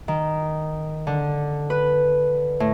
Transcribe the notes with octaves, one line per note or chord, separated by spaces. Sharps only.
D#3
D3
B4
A2